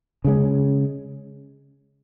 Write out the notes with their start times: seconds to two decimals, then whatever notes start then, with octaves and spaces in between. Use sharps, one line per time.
0.24 C#3 G#3 C#4